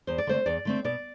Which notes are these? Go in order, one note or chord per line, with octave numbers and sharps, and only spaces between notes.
E2 C5
D5
D3 A3 C4 C5
E2 D5
D3 A3 C4
B2 D5